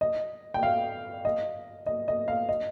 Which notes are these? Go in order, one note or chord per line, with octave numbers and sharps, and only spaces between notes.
D#5
G5
F5
D#5
D#5
D#5
F5
D#5